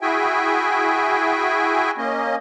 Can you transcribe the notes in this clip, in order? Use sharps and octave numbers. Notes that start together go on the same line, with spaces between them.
E4 F#4 G#4 E5 G5 G#5
A#3 C#4 D#5